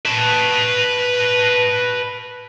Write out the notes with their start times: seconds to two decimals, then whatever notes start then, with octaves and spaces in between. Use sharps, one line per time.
0.06 B4 A5